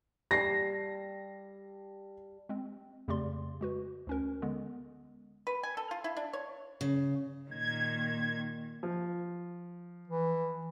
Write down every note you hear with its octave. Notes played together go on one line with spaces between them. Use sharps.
G3 A5 A#6 C7
G#3 C4
F2 C#3 A3 G4 D5 C6
G#3 F#4 B4
D2 C#4 A#4
D3 G#3 B3
B4
G#5
A4
F4
E4
D4
C#5
C#3
A#2 D#3 G#6
F3
E3